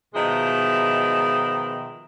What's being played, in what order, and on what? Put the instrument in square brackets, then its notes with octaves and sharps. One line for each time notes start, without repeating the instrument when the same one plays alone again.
[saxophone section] B2 D#3 F3 G#3 D#5 E5